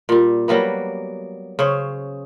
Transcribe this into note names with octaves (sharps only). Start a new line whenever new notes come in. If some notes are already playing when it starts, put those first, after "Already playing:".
A#2 G3
F#3 G3 A#3 B3
C#3 C5 C#5